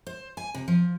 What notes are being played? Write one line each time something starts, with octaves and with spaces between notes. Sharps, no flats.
C5
G#5
C3
F3